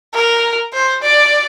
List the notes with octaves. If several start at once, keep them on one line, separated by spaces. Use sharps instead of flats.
A#4
C5
D5